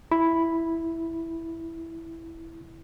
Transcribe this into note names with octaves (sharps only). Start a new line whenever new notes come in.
E4 B5